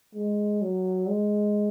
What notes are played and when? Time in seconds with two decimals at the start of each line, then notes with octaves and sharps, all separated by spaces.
0.15 G#3
0.62 F#3
1.09 G#3